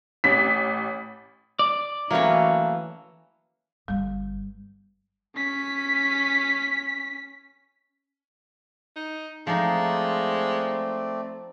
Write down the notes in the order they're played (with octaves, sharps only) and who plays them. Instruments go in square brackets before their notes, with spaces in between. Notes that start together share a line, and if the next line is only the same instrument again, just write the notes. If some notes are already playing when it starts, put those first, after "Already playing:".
[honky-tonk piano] A1 C#4 B6
[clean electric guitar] D5
[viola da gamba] E3 [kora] F#3 A3 C#4 [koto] A#3 C#5
[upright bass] G1 G2 [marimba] G3
[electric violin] C#4 B6
[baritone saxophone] D#4
[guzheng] F3 D#4 [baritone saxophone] G#3 [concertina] A3 C4 D5